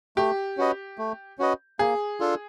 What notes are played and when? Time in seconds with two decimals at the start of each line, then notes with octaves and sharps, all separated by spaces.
0.17 A3 G4
0.57 C#4 F#4 B4 D#5
0.98 A3
1.39 C#4 F#4 B4 D#5
1.79 A#3 G#4
2.20 D4 F4 A4